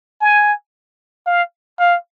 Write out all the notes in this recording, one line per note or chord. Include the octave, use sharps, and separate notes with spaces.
G#5
F5
F5